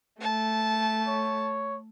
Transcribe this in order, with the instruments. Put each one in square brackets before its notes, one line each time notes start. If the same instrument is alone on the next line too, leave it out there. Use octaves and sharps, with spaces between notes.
[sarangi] A3 [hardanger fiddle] A5
[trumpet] C#5